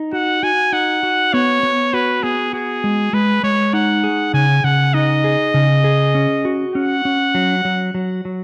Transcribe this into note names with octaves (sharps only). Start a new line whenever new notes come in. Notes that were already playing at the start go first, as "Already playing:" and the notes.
Already playing: D#4
F#4 F#5
F#4 G#5
D#4 F#5
F#4
B3 C#5
B3
F#4 B4
B3 G#4
F#4 G#4
G#3
G#3 B4
G#3 C#5
D#4 F#5
G#4
C#3 G#5
C#3 F#5
D#4 D#5
G#4
C#3
G#4
C#4
F#4
C#4 F#5
C#4
F#3
F#3
F#3
F#3